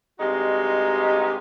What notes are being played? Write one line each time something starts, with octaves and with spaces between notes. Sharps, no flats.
G2 C3 G#3 D#4 F#4 G4